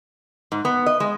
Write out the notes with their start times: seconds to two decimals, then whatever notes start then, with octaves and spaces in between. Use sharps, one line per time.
0.52 G#2
0.65 B3
0.86 D#5
1.00 G#3